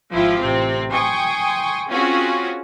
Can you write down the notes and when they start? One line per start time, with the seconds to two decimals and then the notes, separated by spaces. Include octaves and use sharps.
0.12 G#1 F3 E4 F4 G4
0.40 A1 C3 C4
0.92 G5 G#5 C6 C#6 D#6
1.89 C4 C#4 F4 F#4 G#4